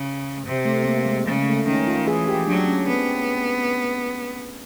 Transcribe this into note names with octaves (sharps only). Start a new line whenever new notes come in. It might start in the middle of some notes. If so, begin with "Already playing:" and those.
Already playing: C#3
C3
A3
A#3
G#3
C#3
A3
D#3 C#4
F4
E3 G#4
G4
F#3 D4
C#4
B3 C4